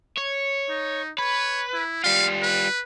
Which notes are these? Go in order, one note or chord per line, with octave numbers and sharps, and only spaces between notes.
C#5
D#4
B4 C#5
E4
G3 F4 F5
B4